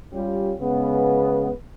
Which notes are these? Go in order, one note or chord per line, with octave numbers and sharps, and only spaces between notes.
G3 C#4 F4 G4
C#3 G#3 B3